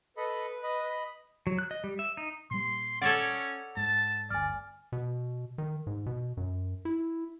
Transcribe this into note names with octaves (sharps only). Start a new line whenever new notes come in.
A4 B4 D#5 B5
D#5 B5
F#3
F#6
D#5
G3
E5
D#4
A#2 G3 C6
C#4 A4 C#5 D5 F#5
G#2 A5
G1 D2 D5 G#5 F6
B2
D#3
G#2
B2
F#2
E4